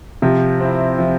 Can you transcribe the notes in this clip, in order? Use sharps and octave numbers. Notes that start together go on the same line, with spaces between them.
C3 F3
C4 E4
F3